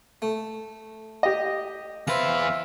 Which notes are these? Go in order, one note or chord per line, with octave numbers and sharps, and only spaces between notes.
A3
G4 D#5
E2 B4 C5 E5 F5 A#5